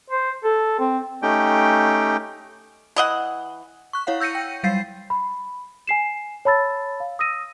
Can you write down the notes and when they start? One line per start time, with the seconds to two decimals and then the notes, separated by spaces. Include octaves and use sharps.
0.10 C5
0.44 A4
0.79 C4
1.22 A3 C#4 D#4 G4 G5
2.96 E3 D#5 F#5
3.93 C#6 F#6
4.07 E4 C#5 F5 F#5
4.20 E6 G6 A#6 C#7 D#7
4.35 G5
4.63 F#3 G3 F5 G6 A6 C7
5.10 B5
5.87 G#5 C7 E7
6.45 C#5 A5 B5 E6 A6
7.00 F5
7.19 D#6 E6 A#6 D#7